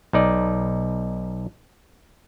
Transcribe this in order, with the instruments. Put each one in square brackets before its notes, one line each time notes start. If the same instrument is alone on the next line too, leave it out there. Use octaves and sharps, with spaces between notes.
[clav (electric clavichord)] B1 D#4 D5